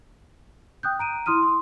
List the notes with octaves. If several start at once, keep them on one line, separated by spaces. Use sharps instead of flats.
G5 D#6 F#6 G6
A#5 D7 D#7
E4 C6 D#6 F6 D#7
C6